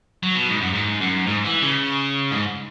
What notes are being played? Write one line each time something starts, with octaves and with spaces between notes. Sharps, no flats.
F#3
B2
G#2
F#2
G#2
F#2
G#2
E3
C#3
G#2